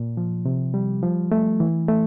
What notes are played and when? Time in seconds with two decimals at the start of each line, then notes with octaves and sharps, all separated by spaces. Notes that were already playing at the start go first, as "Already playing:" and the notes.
Already playing: A#2
0.17 F3
0.45 C3
0.74 G3
1.03 F3
1.32 A3
1.60 E3
1.88 A3